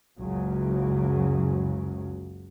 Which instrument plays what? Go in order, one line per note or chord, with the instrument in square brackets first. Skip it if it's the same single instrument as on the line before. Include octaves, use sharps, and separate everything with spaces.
[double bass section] F#1 C#2 C#3 F#3